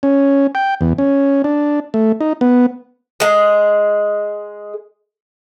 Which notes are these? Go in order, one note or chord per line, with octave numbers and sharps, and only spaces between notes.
C#4
G5
E2
C#4
D4
A3
D#4
B3
G#3 G#4